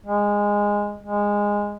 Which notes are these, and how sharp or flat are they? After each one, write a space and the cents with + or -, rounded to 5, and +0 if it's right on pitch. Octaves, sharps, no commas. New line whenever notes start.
G#3 -15
G#3 -15